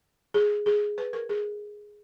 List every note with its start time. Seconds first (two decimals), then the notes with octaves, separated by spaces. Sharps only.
0.34 G#4
0.66 G#4
0.98 B4
1.13 A#4
1.29 G#4